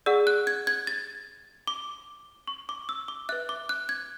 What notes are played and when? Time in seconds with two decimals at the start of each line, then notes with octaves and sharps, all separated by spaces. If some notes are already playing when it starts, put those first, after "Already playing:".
0.06 G#4 D5 F#5 E6
0.27 F#6
0.47 G#6
0.67 G#6
0.87 A6
1.67 D6
2.48 C#6
2.69 D6
2.89 E6
3.08 D6
3.29 B4 E5 F#6
3.49 D6
3.69 F#6
3.89 G#6